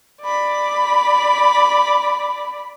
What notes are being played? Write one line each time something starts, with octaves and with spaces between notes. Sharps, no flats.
D5 B5